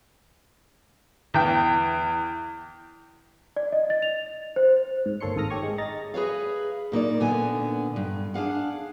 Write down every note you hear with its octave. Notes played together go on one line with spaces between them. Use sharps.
E2 G5
D5
D#5
A6
F7
C5
G#2
G1 A#3 A4 C#5 C6 C#7
G#1 G#2 A4 D#6 F6 A#6
G4 C#5 C#6
G#3
D#5 A#5 A6 A#6
G#4 B4 C#5 F5
A#2 A#3 D#4 D5
A#2 D3 B3 G#5
G2
D4 G#4 F5 F#5